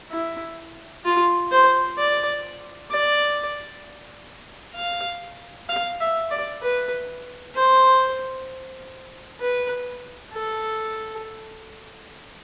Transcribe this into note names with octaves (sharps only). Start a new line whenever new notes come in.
E4
F4
C5
D5
D5
F5
F5
E5
D5
B4
C5
B4
A4